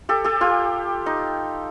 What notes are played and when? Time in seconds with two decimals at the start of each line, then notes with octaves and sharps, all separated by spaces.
0.09 G4 A4
0.24 G4 A4
0.41 F4 G4
1.06 D#4